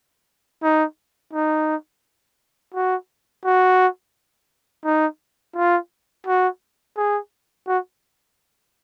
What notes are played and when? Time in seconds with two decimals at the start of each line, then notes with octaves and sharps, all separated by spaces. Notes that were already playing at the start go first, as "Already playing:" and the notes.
0.63 D#4
1.33 D#4
2.74 F#4
3.45 F#4
4.85 D#4
5.56 F4
6.27 F#4
6.97 G#4
7.68 F#4